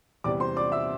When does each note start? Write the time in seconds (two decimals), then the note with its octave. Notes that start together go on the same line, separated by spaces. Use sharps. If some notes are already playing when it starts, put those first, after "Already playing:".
0.24 E2 C3 G3 D5 D6
0.40 C5 C6
0.57 D5 D6
0.72 E5 E6